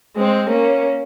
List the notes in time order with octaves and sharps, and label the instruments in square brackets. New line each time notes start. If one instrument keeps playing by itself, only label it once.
[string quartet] G#3 C4
A#3 C#4